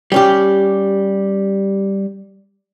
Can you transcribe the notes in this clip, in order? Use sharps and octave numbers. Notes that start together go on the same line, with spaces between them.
G3 C#4 G4